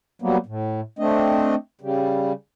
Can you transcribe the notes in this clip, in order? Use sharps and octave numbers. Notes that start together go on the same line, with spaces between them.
F#3 G3 A#3 B3
A2
A3 C4 D4 D#5
C#3 G3